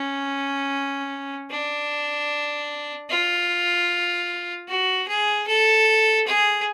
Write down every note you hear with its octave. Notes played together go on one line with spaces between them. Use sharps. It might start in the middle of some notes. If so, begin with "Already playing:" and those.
Already playing: C#4
D4
F4
F#4
G#4
A4
G#4